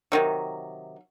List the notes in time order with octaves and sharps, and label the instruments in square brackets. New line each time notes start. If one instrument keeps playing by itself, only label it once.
[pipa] C3 D#3 F#3